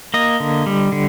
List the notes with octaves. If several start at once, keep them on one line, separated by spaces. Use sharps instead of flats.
A#3 D#5
D3
G3
D3